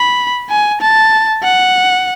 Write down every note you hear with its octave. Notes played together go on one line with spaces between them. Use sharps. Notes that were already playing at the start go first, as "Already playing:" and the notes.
Already playing: B5
G#5
A5
F#5